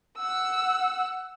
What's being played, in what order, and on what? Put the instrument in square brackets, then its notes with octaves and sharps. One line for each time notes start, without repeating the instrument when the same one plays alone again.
[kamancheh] F#5 E6